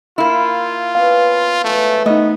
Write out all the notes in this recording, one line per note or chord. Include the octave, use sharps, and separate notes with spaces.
A#3 E4 F4
B3 C#4 F5
G#2 E3 F#3 A3
A3 B3 D#4 D#5